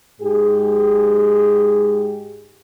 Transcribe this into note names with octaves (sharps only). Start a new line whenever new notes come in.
G#2 G4 G#4